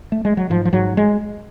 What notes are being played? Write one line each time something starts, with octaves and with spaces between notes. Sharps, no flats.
A3
G#3
F#3
G#2 F3
F3
G#2 F#3
G#3